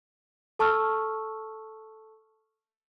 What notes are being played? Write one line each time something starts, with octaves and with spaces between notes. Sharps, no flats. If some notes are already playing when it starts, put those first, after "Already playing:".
A4 A5 C#6 E6 F6